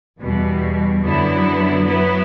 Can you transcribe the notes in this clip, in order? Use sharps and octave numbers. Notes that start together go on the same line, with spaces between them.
E2 B2 G3
F#2 D3 F#3 B3 E4
F#3 B3 E4 B4